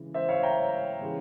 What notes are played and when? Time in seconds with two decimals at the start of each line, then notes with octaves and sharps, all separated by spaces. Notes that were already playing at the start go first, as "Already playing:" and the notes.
Already playing: C#3 E3 G#3
0.14 C5 E5
0.29 C#5 F5
0.43 G5 A#5
1.01 C#3 E3 G#3